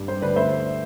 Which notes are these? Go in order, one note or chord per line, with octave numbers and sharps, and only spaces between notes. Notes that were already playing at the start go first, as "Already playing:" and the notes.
Already playing: G2
G3 C5
D2 B4 D5
A3 C5 E5